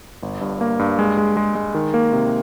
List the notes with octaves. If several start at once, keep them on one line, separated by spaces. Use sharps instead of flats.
G1
G2
A#3
G2
G#3
G#3
G#3
G#3
D#3
A#3
C3